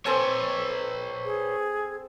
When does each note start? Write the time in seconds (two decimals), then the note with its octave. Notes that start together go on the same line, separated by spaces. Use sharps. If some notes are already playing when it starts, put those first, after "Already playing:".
0.06 C4 A4 B4 C#5 G#5
1.25 G#4